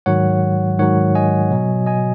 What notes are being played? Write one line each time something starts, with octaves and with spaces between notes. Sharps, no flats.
G#2 D#3 F#3 C#5 F#5
G#2 D#3 F#3 C#5 F#5
D#5 G#5
B2 F#3
D#5 G#5